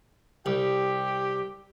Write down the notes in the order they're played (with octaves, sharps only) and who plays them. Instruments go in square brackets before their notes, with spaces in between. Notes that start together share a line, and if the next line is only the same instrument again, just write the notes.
[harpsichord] C2 [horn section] G4